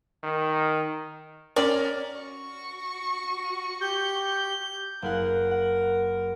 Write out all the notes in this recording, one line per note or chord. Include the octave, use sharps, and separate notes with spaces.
D#3
C#4 A#4 D5
F#4 C#6
G4 G6
F#1 G#4 A#4 F#5
F#5